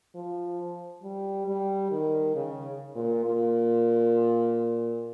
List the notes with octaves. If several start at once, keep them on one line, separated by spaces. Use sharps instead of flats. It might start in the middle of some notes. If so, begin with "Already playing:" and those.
F3
G3
G3
D#3
C#3
A#2
A#2